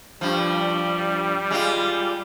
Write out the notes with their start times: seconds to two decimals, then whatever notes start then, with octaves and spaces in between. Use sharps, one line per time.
0.21 G2 F3 G3
1.51 G#3 F4